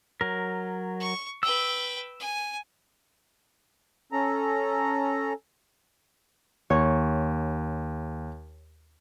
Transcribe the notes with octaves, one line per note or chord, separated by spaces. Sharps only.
F#3 A#4
C#6
B4 G5 E6
G#5
C#4 A4 A#5
D#2 C#5